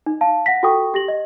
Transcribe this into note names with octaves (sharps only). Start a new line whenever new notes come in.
D#4
F5 A5
F#5 A#6 B6
F4 F#4 A4 G5 C#6 D#6
G4 A#6 F#7
D#5